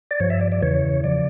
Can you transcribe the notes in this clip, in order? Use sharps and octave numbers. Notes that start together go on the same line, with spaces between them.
D5
G2 F3 C#5
E5
D5
D5
E2 C#3 E3 C#5
C#3 F3 D5